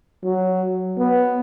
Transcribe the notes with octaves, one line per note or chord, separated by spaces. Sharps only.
F#3
B3